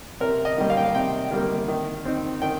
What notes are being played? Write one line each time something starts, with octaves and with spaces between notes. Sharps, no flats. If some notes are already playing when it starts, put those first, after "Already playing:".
C3 A#4
D#5
D#3 G3 A#3
F5
G5
F5
C3 G5
D#3 G3 A#3
D#3
C4 D#4
D#3 G5